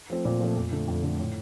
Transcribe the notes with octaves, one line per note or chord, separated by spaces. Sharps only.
F3 A3 C4
A#2
F3 A3 C4
F2
D3 A3
F2
D3 A3
A2